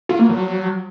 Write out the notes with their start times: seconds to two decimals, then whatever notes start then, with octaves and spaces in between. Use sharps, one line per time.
0.09 F4
0.19 A#3
0.29 F#3